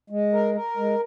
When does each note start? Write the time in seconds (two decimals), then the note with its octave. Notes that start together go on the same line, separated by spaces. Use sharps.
0.10 G#3
0.33 A#4
0.54 A#4
0.77 G#3